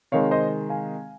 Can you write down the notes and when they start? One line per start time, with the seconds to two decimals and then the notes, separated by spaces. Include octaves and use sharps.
0.12 C3 D#3 G#3 C#5 F5
0.31 C5 D#5
0.70 F5 G#5